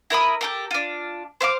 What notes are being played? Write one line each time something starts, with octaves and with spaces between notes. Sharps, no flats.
E4 A#4 B5 D#6
G4 A4 A#4
D4 F4
C5 E5 F5 D6